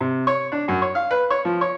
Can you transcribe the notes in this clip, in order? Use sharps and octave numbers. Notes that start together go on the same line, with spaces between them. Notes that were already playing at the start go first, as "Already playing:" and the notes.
C3
C#5
D4
F#2
C#5
F5
B4
C#5
F3
C#5